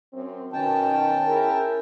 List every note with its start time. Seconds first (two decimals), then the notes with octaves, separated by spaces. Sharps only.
0.14 F#2 C4
0.53 B2 D#3 C#4 G5 A5
1.26 E4 G#4 A#4